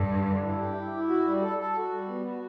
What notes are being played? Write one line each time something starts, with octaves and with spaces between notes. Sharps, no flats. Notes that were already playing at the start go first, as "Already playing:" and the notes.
Already playing: G2 A4
D3
D4
E4
G4
E4
E4
F#4
G3
A4
A4
F#4
G3
B3
F#4